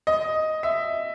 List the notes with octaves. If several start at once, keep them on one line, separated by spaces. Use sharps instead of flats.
D#5
E5